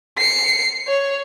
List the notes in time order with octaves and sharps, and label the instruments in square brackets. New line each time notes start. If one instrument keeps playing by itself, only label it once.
[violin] C7 C#7
C#5